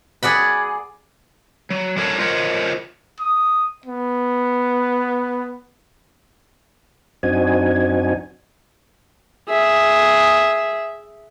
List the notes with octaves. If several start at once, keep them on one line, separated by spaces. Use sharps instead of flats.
G#4 D5 F#5 B5
F#3
F#3 G3 D4 A4 A#4 C#5
F4 A#4 C5 C#5 D#5 F#5
D#6
B3
F#2 C4 D4 D#4 F#4 G#5
G#4 E5